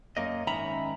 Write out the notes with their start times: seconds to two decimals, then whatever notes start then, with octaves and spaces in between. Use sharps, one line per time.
0.17 F#2 A#3 D#5
0.47 G#2 D#3 C#4 E5 A#5 B5